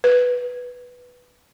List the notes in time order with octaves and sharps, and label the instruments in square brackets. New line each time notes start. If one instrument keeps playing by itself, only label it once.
[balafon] B4